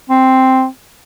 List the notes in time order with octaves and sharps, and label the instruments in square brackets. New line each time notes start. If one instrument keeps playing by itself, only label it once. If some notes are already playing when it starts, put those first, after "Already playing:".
[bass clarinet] C4